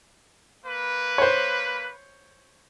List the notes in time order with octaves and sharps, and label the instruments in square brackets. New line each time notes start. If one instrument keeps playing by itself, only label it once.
[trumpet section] A#3 B4
[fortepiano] C5 C#5